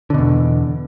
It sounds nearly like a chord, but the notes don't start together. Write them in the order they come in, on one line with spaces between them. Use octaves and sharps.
D3 B2 E2